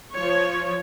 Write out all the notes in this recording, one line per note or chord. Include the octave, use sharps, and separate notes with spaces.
F3 C#5